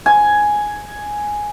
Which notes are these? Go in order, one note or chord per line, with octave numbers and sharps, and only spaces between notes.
G#5